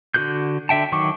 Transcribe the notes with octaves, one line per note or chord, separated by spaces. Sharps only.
D3 F#4 G#4 F#6 G6
D3 E5 G5 A5
D#3 F#3 C#6 D6